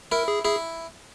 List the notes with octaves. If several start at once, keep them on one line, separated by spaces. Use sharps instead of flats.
E4 A#4
G#4
E4 G#4